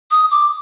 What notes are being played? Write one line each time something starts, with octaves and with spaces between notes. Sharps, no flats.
D#6
D6